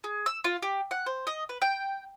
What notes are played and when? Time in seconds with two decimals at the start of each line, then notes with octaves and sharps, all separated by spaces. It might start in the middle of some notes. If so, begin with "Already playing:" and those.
0.04 G#4
0.26 E6
0.44 F4
0.62 G4
0.91 F#5
1.06 C5
1.27 D#5
1.49 B4
1.62 G5